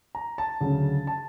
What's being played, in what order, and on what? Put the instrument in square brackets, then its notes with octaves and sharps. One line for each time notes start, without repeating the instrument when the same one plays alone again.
[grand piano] A#5
A5
D2 C#3 F#3
A5